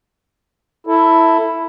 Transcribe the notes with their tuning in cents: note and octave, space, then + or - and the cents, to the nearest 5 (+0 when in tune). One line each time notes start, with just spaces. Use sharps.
E4 +0 A4 +15